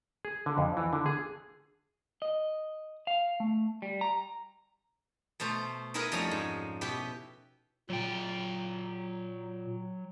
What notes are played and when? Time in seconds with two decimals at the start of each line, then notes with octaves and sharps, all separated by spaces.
0.25 G#4
0.46 D3
0.58 F2
0.77 E3
0.93 D3
1.06 G#4
2.22 D#5
3.07 F5
3.40 A3
3.82 G3
4.01 A#5
5.40 B2 A3 C5 A#5
5.94 D#4 E4 G#4 A#4 B4 D#5
6.12 F2 G3 A3 C#4 D#4 A#5
6.31 G#2
6.81 B2 E4 G4 B4
7.90 A#2 F#3 G5